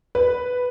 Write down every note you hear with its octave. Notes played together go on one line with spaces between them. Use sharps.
B4